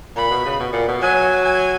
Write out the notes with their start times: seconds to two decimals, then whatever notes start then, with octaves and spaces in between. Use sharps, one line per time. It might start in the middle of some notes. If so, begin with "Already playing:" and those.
0.16 A#2 B5
0.30 B2
0.45 C#3
0.59 B2
0.73 A#2
0.88 B2
1.01 F#3 G#5
1.44 G#5